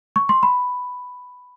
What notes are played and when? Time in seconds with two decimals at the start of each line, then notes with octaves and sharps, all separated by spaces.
0.16 C#6
0.29 C6
0.43 B5